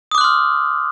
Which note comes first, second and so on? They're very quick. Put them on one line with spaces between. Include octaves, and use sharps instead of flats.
D#6 D6 F#6 C6 F6